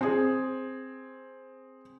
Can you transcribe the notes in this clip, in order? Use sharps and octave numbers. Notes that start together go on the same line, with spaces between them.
C4 G#4